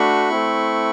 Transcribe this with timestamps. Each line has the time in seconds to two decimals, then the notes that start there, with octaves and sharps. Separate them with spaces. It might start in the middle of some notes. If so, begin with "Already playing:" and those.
Already playing: A3 D4 F#4 B5 C#6
0.30 A3 C4 E4